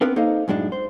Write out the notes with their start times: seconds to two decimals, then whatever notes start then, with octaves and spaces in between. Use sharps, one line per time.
0.01 B3 C4 D4 A#4 B4
0.16 A#3 D#4 A4 C5 D#5 F5
0.48 F#2 A2 G#3 D4 D#4
0.72 C5